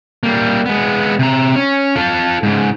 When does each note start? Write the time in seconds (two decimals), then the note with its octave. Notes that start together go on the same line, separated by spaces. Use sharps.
0.23 G3 A#3
0.66 G#3 B3
1.19 C3 A#5
1.56 C#4
1.96 F4 A4
2.43 G#2 C#3